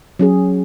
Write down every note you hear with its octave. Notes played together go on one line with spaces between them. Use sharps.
F#3 C#4 G#4